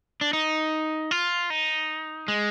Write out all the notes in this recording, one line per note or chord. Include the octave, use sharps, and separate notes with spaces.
D4
D#4
F4
D#4
G#3